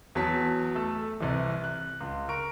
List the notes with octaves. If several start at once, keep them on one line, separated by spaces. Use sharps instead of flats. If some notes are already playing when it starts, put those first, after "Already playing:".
E2 F#3 A5 B6
A3 A4
C2 E3
F#6
C#2
A#4 C#6 D7